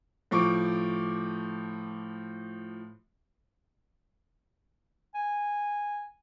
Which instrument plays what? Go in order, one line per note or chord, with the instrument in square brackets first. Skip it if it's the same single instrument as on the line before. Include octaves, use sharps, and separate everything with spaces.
[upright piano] A2 F3 C#6 D6
[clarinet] G#5